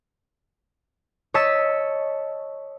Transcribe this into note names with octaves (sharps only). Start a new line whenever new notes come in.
C#5 D#5 A5 E6 B6